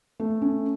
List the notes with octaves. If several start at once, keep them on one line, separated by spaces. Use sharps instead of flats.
A3
C#4